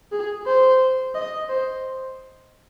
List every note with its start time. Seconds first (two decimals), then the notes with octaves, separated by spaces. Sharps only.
0.12 G#4
0.47 C5
1.15 D#5
1.49 C5